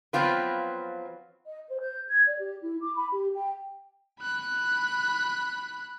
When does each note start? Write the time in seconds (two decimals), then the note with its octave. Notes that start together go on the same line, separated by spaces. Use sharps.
0.13 F3 F#3 B3 C4 F4 B4
1.45 D#5
1.68 C5
1.80 G6
2.09 G#6
2.26 D5
2.39 G4
2.61 E4
2.81 D6
2.96 B5
3.12 G4
3.33 G5
4.20 B5 F#6